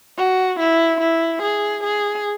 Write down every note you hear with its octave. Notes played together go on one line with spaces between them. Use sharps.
F#4
E4
E4
G#4
G#4